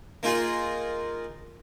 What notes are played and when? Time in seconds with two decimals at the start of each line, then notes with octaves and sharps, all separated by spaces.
0.23 A#3 D#4 F4 G#4